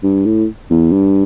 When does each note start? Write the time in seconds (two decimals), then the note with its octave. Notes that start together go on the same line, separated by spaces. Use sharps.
0.03 G2
0.26 A2
0.70 E2
0.92 G2